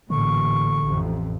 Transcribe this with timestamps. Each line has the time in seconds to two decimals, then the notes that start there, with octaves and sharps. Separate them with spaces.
0.10 A1 A#2 D3 C#6
0.83 A1 F2